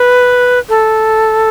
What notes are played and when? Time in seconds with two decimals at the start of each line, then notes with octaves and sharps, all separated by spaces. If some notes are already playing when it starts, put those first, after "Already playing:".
Already playing: B4
0.69 A4